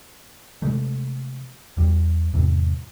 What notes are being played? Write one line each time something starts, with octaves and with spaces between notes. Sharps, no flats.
C3 E3 G#3 A3
E2 G3
E2 G#2 C3